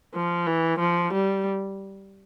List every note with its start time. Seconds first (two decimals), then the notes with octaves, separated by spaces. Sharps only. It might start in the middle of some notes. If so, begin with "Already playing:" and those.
0.14 F3
0.47 E3
0.79 F3
1.13 G3